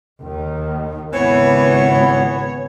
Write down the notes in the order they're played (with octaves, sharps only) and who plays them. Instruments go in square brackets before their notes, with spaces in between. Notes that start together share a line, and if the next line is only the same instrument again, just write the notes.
[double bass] D#2 D#3
[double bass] G#1 C#3 [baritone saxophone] E3 [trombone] B3 [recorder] C#5